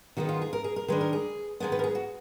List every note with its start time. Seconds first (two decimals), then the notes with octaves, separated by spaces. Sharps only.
0.17 D#3 G#3 B3 F#4
0.29 F4
0.42 G#4
0.53 A#4
0.64 G#4
0.76 A#4
0.88 D#3 G#3 D4 B4
1.01 A#4
1.13 G#4
1.60 D#3 G#3 B3 A#4
1.72 B4
1.79 A#4
1.84 G#4
1.95 F#4